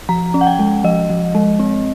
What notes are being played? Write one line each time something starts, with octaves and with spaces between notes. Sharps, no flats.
F3 A#5
C#4
F#5
G5
G#3
F3 D#5
F3
G#3
C4